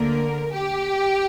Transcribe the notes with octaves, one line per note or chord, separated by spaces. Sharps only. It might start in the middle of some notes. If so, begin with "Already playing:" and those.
Already playing: D2 D3 A#3 A#4
G4